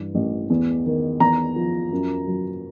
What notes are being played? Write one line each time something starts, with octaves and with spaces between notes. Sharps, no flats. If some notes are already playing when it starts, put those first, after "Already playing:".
Already playing: G2 E3
A1
E2
D#3
E2 A#5
F3
F#2
F#3